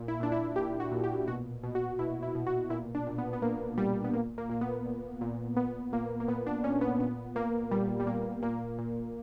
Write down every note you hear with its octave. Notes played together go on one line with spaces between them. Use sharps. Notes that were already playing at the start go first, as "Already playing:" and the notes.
Already playing: A#2
E4
A#2 D4
E4
A#2 G4
F#4
A#2
G4
B2 F#4
B2
F#4
B2 E4
E4
B2
F#4
A#2 E4
D4
A#2
B3
B3
A#2 A#3
A#2 G3
B3
A#2 A#3
A#3
A#2 A#3
B3
A#2
A#2
A#2 B3
A#2 A#3
A#3
A#2 B3
D4
A#2 C#4
B3
A#2 B3
A#2 A#3
A#2 G3
G3
A#2 A#3
A#2 A#3
A#2